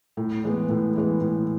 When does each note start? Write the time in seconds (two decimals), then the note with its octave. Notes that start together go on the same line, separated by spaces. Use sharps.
0.17 A2
0.44 E3 G#3 B3
0.69 A2
0.95 E3 G#3 B3
1.21 A2